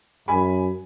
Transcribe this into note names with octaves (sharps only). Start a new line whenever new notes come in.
F#2 G#5 B5